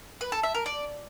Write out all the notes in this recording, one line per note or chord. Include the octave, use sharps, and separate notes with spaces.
B4
A4
E5
A#4
D5